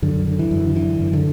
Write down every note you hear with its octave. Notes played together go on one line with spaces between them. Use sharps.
F#2 D3
D3
E3
F#2
D3
D3 E3
F#2
D3